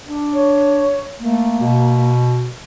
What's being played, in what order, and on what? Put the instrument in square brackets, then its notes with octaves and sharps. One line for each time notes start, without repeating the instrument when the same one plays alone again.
[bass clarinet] D4
[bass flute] C#5
[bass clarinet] A3 [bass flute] A#3
[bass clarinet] B2